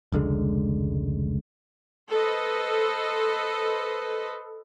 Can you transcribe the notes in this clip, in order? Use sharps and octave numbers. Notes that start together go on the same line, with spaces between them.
F1 C#2 D3 G#3
A4 B4 C5 D#5